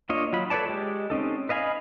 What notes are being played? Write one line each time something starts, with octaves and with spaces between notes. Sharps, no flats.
A#3 D4 F4 C#5 D#5
F#3 F4 B5
A4 B4 C#5 D5 A5
G#3 G4
C4 C#4 D#4 A4
B4 D#5 F5 G#5 B5